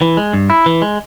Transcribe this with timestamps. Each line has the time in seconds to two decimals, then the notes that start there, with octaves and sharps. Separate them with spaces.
0.01 E3
0.17 G#3
0.33 G2
0.50 E4
0.66 E3
0.82 G#3